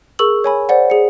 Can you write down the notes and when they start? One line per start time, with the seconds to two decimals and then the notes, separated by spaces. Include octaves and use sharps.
0.19 G#4 A#4 C#6 E6 F#7
0.44 C#5 G#5 B5
0.69 C5 D5 F#5
0.90 G#4 C#7